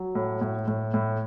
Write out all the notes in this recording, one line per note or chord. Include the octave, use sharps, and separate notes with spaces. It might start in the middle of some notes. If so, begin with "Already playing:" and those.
Already playing: F#3
A2
A2
A2
A2